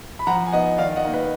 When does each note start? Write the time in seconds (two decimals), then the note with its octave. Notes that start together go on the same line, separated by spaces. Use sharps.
0.19 B5
0.27 F3 F#5 A#5
0.47 G#5
0.52 B3 D#4 D#5 F#5
0.78 D#3 D5 F5
0.96 D#5 F#5
1.05 A#3 D#4
1.13 B4 D#5